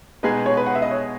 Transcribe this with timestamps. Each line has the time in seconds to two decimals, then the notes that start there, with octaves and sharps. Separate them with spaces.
0.23 B2 G#3 D#4 G#4 B4
0.46 C#5
0.57 B4
0.66 F#5
0.75 E5
0.82 D#5
0.91 C#5